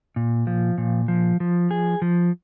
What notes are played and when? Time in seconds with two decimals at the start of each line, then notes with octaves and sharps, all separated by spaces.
0.16 A#2
0.47 F3
0.78 A#2
1.08 F3
1.40 F3
1.71 G#4
2.02 F3